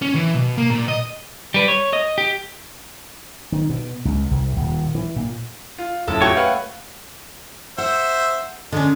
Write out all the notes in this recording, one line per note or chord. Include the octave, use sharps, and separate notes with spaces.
C#4
E3
B2
A#3
A#2
D#5
G3 B4
C#5
D#5
G4
D#3
B2
C#2
C2
D#1
E3
A#2
F4
F#1 A2 A4
A3 F#4 G4 C#5 G5
B4 F5 F#5
C5 E5 F#5
D3 G#3 C#4